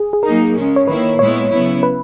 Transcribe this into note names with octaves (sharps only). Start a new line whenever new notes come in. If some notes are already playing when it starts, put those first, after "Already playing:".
Already playing: G#4
G#4
F#3 A#3 D#4 A#4
C#3 G#3 C#4
C#5
D#3 A#3 E4 B4
A#2 G#3 B3 E4 C#5
C#3 F#3 B3 E4
B4